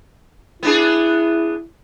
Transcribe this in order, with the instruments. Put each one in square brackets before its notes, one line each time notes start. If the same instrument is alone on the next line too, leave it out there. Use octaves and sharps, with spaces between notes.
[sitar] B3 D4 G#4 [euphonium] E4